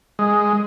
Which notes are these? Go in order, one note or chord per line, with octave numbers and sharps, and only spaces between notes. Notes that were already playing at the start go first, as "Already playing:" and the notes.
G#3